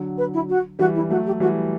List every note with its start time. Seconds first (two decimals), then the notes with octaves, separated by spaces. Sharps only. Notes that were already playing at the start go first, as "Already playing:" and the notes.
Already playing: D3 F#3
0.17 B4
0.33 E4
0.49 F#4
0.79 E3 G3 F#4
0.94 E4
0.98 G3
1.09 F#3 A3 F#4
1.26 G4
1.40 E3 G3 F#4